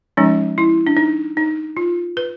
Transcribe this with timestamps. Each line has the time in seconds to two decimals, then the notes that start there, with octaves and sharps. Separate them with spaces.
0.17 F3 G#3 C#4 D#4
0.58 E4
0.87 D4
0.97 D#4
1.37 D#4
1.77 F4
2.17 B4